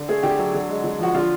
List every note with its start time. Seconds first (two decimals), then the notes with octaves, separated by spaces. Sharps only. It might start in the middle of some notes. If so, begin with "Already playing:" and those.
Already playing: D3
0.08 A3 G#4
0.23 D3 G4
0.39 F#3
0.54 D3
0.69 G#3
0.84 D3
0.99 F3 F#4
1.14 D3 F4